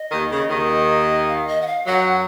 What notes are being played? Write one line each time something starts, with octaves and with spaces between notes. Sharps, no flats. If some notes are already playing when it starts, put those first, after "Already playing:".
Already playing: D#5
D#2 D#3
C#3
D#2 D#3
F5
D#5
F#5
F5
F#2 F#3 F#5